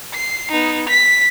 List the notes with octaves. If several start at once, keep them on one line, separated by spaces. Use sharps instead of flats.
C7
B3 D#4
B6